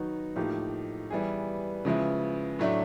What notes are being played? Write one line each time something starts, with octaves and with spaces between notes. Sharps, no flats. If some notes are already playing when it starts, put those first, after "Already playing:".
Already playing: D#3 F#3 B3 D#4 F#4
A2 F3 A#3 D#4 G4
E3 G3 B3 E4 G#4
C#3 F3 G#3 B3 E4
A2 F#3 A3 D4